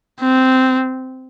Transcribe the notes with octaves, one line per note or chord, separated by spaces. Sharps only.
C4